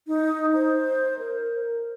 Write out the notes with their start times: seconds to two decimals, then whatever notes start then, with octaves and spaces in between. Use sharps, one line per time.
0.08 D#4
0.54 C5
1.19 A#4